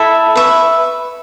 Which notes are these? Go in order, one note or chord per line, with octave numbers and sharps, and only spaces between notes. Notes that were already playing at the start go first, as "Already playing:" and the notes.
Already playing: E4 A4 E5 B5
B4 E5 C#6